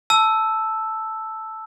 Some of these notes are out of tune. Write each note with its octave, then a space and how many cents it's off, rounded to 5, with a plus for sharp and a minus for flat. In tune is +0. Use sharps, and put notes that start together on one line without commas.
A5 +0 E6 +0